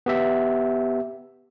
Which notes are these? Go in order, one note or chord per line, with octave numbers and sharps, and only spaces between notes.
B3 G4 E5